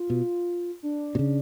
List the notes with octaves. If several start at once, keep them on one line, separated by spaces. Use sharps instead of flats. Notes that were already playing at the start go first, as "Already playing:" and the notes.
Already playing: F4
B2
D4
B2
C#3